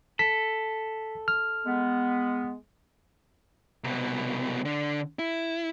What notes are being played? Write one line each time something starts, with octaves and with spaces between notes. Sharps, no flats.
A4 B6
F6
G#3 B3
C2 B2
D3
E4